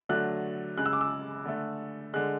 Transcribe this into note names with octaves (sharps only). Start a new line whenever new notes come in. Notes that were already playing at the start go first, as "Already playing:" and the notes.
D3 F#3 A3 F#6
C#3 G#3 F#6
E6
D6
E6
D3 A3
D3 G#3 F#6